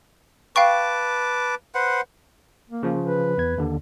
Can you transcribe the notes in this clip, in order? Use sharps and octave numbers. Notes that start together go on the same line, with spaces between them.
B4 F5 G5 A5 C#6 D6
B4 C5 F#5
A#3
C#3 F3
B4
E2 G#6
D#2 D3